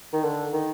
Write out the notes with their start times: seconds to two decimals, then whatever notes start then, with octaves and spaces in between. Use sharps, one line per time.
0.13 D#3
0.24 D3
0.53 D#3